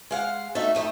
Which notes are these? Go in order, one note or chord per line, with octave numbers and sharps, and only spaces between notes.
G#3 F5 F#5
A3 D#4 F#4 E5
F2 A3 D#4